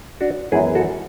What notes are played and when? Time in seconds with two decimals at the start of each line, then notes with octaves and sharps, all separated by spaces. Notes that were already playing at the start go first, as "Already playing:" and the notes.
0.21 D4 F#4
0.52 F#2 E3 G#3 B3 E4 G#4
0.75 F#4 A4